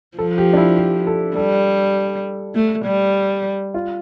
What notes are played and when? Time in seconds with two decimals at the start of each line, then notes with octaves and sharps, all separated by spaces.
0.18 F3 A4
0.38 G4
0.53 D4
0.57 E4
0.77 G4
1.07 A4
1.36 G3 A4
2.55 A3
2.85 G3
3.74 F4